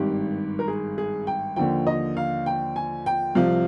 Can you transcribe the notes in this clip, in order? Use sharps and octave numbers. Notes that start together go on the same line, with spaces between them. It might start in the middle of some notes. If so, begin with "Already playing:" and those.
Already playing: G#1 G2 D#3 G4
A#4
G#4
G#4
G5
D#2 D3 F3 G5
D#5
F5
G5
G#5
G5
C2 C3 F3 F5